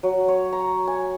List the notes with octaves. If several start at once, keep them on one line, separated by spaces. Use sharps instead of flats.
F#3
C#5
A#5
G#5